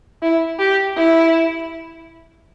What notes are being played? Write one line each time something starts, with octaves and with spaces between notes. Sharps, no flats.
E4
G4
E4